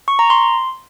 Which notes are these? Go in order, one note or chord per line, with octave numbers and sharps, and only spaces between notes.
C#6
A#5
C6